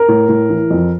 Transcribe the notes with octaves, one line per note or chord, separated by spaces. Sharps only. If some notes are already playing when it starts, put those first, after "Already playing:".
Already playing: A#4
A2
A2
E3
F2